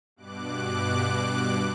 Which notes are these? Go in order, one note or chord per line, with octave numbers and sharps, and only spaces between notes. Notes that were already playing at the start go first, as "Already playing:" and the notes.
G2 B2 D6 F#6